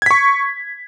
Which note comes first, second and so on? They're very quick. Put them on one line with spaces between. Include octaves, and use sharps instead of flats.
G#6 B6 C#6